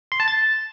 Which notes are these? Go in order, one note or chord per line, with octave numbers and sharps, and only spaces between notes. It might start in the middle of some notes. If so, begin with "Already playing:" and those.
C6
A5
A6